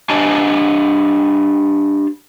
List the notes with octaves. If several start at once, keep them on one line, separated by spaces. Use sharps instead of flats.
D4 G4 D#5 G#5 A5